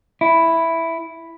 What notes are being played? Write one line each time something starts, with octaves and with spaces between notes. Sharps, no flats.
E4